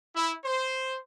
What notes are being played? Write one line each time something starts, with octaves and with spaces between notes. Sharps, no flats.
E4
C5